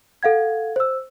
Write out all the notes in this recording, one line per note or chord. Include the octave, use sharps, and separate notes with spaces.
A4 F5 F#5 G#6
C5 E6